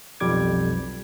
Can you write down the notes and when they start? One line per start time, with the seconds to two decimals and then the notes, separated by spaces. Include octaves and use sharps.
0.20 B1 F2 G3 D6 G#6